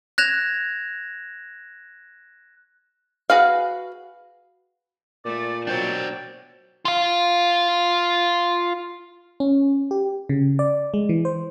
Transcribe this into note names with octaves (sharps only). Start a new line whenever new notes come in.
F#6 G#6 A#6 E7 F7
F#4 G#4 B4 F5
A#2 A3 D5
B2 F#3 D4 C5 D5 G5
F4 F5
C#4
G4
C#3
D5
G#3
E3
C5